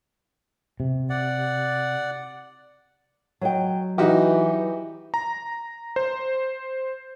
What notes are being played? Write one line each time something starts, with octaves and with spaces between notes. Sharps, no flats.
C3
D5 F#5
F#3 D#5 G5
E3 D#4 F#4 G4
A#5
C5